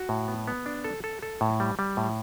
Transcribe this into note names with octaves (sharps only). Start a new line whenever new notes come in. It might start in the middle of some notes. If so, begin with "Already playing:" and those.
Already playing: F#4
A2
B3
B3
D4
A4
A4
A4
A2
G3
G3
A2